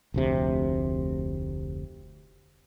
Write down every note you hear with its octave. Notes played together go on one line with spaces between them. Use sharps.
F1 D2 C3